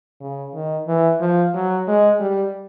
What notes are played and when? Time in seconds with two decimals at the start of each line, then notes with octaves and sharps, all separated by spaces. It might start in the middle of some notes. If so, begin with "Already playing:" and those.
0.21 C#3
0.54 D#3
0.88 E3
1.20 F3
1.54 F#3
1.87 G#3
2.20 G3